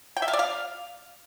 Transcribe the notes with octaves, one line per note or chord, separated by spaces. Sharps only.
G5
E5
F5
D5
F5